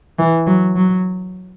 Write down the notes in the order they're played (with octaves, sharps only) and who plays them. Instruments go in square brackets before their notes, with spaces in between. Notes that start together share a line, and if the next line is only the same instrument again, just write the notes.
[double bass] E3
F#3
F#3